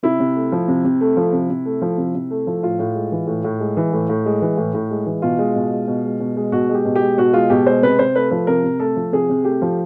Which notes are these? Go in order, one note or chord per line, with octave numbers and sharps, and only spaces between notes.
C3 E4
C3
A3
F3
C3
C3
A3
F3
C3
C3
A3
F3
C3
C3
A3
F3
A2 F4
A2
G#3
E3
A2
A2
G#3
E3
A2
A2
G#3
E3
A2
A2
G#3
E3
B2 F4
G#3
B2
G#3
B2
G#3
B2
G#3
B2 F#4
G#3 G4
B2
G4
G#3
B2 F#4
G#3 F4
B2 G4
G#3 C5
C3 B4
C3 C5
A3 B4
F3 B4
C3 A#4
C3
A3 A4
F3
C3 G#4
C3
A3 G4
F3